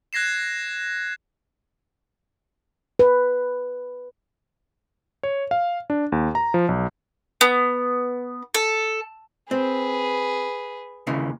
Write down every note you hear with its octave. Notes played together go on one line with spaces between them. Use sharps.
F#6 G#6 A#6 C7 E7
B4
C#5
F5
D4
D#2
A#5
F3
B1
B3
A4
C4 G#4 B4
D#2 C#3 E3